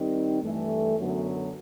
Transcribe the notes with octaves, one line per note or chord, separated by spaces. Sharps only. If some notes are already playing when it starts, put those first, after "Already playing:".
Already playing: D#3 G3 C4 D#4
G2 E3 A3
F#2 D3 F#3 B3